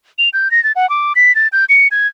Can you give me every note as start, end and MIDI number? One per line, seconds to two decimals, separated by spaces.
0.18 0.29 101
0.33 0.51 91
0.51 0.63 94
0.64 0.72 93
0.76 0.89 78
0.90 1.13 86
1.16 1.35 95
1.35 1.48 93
1.53 1.65 91
1.69 1.88 97
1.91 2.07 92